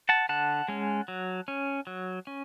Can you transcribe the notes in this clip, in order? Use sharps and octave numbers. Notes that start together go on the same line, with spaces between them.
F#5 A5
D3 F#5 A5
G#3 C#4
F#3
C#4
F#3
C#4